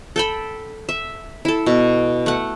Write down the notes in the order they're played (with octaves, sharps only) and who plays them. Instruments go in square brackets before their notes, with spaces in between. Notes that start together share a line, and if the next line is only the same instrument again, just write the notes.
[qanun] A4 G5 B5
E5
E4 A4
B2
A3 F#5